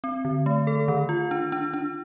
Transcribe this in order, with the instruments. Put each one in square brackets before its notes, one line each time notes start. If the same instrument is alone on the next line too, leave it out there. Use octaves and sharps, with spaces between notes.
[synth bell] C4
D3
A3
A4
D#3
F4
D4
D4
D4